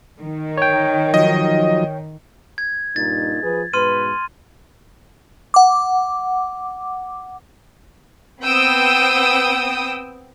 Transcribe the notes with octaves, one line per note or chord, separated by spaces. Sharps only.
D#3
C#5 G5
F3 F#3 D#4 D#5
G#6
G2 A#2 D#4 A6
F3 G#4 B4
G#2 B2 B4 C6 F6 D#7
F#5 D6
B3 C4 G5 D#6 E6